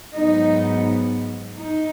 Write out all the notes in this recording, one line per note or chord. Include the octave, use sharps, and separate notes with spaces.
G#2 F#3 B3 D#4
D#4